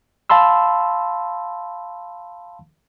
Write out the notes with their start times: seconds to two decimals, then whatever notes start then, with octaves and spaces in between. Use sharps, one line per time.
0.30 F5 A5 B5 C6 E6